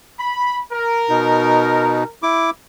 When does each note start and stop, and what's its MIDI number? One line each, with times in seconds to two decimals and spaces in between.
0.20 0.59 83
0.72 2.13 70
1.09 2.04 47
1.09 2.04 63
2.23 2.50 64
2.23 2.50 86